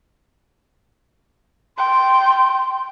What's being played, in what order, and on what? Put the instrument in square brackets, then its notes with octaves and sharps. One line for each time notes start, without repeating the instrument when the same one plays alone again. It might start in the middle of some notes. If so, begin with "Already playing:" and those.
[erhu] G5 [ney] C6